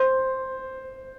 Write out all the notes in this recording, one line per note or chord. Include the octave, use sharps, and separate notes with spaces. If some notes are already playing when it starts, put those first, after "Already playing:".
Already playing: C5